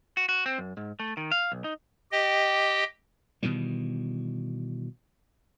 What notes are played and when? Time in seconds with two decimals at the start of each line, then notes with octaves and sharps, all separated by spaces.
0.17 F#4
0.29 F#4
0.46 C4
0.58 F#2
0.77 G#2
1.00 A3
1.17 D#3
1.32 F5
1.52 B1
1.64 D#4
2.12 G4 D#5 G5
3.43 B2 D#3 E3 G3